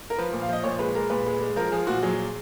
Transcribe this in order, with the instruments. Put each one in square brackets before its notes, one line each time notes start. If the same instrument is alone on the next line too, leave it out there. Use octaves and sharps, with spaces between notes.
[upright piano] A#4
F3 B4
A#2
F5
F3 D#5
A#2 C#5
G#3 B4
G#3 A#4
A#2 B4
G#3
G#3
F3 A#4
F3 G#4
A#2 F#4
F#3 G#4